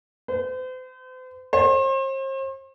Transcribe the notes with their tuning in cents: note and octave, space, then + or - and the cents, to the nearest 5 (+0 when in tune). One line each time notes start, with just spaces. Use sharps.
C5 -40
C5 +40